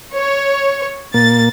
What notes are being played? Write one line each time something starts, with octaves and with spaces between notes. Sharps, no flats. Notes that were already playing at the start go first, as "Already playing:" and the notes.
C#5
A#2 A#3 A6